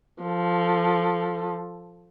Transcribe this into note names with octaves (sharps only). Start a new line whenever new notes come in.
F3 A4